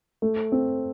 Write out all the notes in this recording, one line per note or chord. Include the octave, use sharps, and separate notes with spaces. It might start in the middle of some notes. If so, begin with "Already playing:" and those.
A3
C4